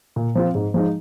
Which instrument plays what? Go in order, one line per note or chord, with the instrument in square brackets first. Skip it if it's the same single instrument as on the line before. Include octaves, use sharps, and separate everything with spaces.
[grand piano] A#2
F3 C4 F4
G#2
F3 G#3 D#4